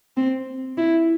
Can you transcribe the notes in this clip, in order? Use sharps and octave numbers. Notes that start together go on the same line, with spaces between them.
C4
E4